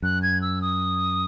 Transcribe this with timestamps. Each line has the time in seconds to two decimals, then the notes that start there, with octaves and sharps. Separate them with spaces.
0.02 F#2 F#6
0.23 G#6
0.42 E6
0.62 D#6